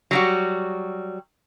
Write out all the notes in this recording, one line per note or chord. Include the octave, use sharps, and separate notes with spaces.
F#3 G3 F#4